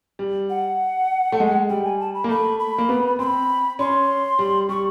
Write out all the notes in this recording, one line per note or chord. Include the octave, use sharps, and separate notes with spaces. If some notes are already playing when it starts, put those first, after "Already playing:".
G3
F#5
A3
G#3
G3 G5
G#5
A5
B5
A#3
A3 B5
B5
A#3
B3
C4 B5 C6
C#4 C6
G3
G3 C#6